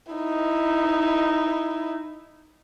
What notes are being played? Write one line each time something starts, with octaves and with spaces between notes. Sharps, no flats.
D#4 E4